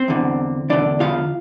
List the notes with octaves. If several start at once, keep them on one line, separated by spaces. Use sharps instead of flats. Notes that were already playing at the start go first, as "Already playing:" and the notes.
Already playing: C4 C5
E2 D3
E2 D3 D4 D5
F4 F5